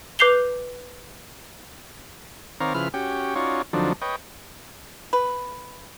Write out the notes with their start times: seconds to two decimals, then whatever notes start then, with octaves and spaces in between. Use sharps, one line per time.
0.19 B4 D6 G6 C7 F7 G7
2.60 D#3 C4 C#5 D5 F5 A#5
2.74 C#3 F3 E4 B4 F6
2.94 C#4 F#4 G4 G5
3.36 C#4 D#4 F4 F#4 C#5 D5
3.73 F2 D3 F3 F#3 D4 D#4
4.02 B4 C#5 D#5 G5
5.13 B4